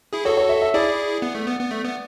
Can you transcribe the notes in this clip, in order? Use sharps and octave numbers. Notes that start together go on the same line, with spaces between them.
E4 G#4
F#4 A4 C#5
C#5
E5
E5
E4 G#4 D5
B3
A3
B3
B3
A3
B3